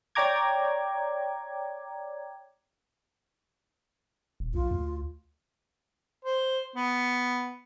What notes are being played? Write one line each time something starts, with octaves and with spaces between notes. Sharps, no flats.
C#5 D5 G5 A#5 D6 G#6
D#1
B1 F4
D2
C5
B3